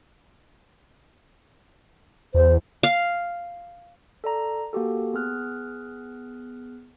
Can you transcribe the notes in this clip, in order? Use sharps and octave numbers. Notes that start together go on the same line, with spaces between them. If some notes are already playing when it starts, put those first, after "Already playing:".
E2 C5
F5
A4 D5 A#5
A#3 F#4 G4 A4
B3 G#4 F6 F#6